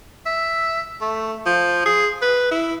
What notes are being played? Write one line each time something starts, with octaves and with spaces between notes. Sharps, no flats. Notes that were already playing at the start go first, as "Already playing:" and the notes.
E5
A3
F3
G#4
B4
E4